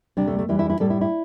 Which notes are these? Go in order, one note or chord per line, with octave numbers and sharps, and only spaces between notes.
D2 C3 G3 D4
A3
A3
E2 E3 G3 E4
E4
E4
A2 G3 A4
E4
E4